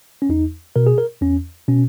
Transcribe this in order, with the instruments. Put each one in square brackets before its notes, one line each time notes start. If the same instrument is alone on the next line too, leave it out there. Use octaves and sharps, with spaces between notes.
[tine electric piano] C#4
E2 D#4
B2 A#4
G#4
A#4
E2 C#4
B2 C#4